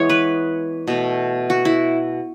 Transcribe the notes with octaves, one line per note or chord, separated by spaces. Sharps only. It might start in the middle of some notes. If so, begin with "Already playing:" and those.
Already playing: E3 G#3 B3 C#5
B4
B2 A3
F#4
E4